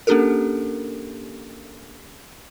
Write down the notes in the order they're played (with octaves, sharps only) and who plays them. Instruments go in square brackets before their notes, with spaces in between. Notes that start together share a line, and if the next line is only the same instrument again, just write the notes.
[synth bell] A#3 C#4 D4 G4 A4 A#4